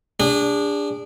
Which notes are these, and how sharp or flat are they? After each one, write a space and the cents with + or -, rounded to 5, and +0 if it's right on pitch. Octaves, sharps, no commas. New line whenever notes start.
D4 -10 G#4 -35